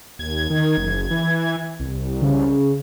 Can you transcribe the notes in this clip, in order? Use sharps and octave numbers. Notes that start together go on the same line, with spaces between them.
D#2 G#6
D#3
F#1
E3
C2
C#3